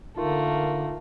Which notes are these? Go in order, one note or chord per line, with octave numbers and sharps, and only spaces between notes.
D3 A3 A#3 D#4 F4 A#4